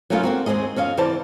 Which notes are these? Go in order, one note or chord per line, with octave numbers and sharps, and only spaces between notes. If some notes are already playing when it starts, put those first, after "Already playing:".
F#3 A3 A#3 C#4 D#4 F4
A#3 C4 F#4
D#2 G#3 C4 G#4 D#5
F2 C#4 D#5 F5
C3 E3 C5 D5 A5